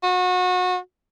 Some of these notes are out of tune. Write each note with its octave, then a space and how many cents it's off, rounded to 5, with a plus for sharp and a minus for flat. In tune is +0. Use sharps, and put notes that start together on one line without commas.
F#4 -30